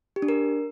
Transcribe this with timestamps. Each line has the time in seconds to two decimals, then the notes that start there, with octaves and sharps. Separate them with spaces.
0.16 G4
0.22 D4
0.29 A#4